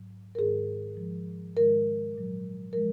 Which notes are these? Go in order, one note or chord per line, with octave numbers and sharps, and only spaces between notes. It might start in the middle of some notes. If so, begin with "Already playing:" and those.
Already playing: G#2 F#3
A#4
G#2 D#3 G#3 G#4
G#2 F3 G#3
G#2 D#3 G#3 A#4
A#2 F#3
F3 G#3 A#4